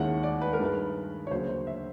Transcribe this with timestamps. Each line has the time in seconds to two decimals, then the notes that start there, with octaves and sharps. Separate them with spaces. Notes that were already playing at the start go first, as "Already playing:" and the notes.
Already playing: D#2 D#3 G#3 C#4 E4 F#5
0.23 D5
0.41 B4
0.53 A#4
0.59 G2 D#3 G#3 B4
1.27 C#5
1.31 D2 C#3 F#3 A#3 C5
1.49 C5
1.67 E5